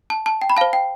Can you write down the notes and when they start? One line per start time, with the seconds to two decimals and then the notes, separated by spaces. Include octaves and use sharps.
0.10 A5
0.26 A5
0.42 G5
0.50 B5
0.57 C5 F5 A5
0.73 G5